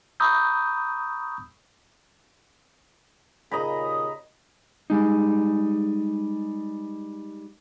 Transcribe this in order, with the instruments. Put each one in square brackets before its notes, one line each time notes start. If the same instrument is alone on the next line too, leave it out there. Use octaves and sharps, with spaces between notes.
[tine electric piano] A#5 B5 C#6 D#6 E6 G6
[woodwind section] D#2 A#2 C#3 [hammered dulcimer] D#5 A#5 B5
[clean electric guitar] G3 G#3 D#4